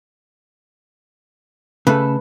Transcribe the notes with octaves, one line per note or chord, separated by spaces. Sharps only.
C#3 A3 A4 B4